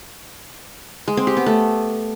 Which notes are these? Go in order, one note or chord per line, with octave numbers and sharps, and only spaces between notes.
G#3
C4
G4
B3
A3